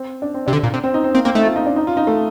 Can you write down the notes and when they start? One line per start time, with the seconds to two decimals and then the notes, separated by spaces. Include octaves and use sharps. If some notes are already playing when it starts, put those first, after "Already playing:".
Already playing: C4
0.22 D4
0.34 C4
0.46 C3 D4
0.53 D3
0.63 A#2
0.74 C3
0.84 C4
0.94 D#4
1.04 C4
1.15 A#3 C4
1.25 A#3 C4
1.35 A3 D#4
1.45 F4
1.56 D#4
1.66 D4
1.76 D#4
1.87 F4
1.97 D#4
2.07 A3